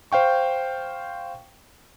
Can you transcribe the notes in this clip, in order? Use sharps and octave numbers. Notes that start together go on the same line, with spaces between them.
C5 F5 G5 C#6